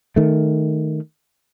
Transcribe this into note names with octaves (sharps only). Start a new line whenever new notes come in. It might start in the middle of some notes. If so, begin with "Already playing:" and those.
D#3 A3